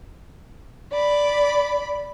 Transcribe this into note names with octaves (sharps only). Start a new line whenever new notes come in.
D5 B5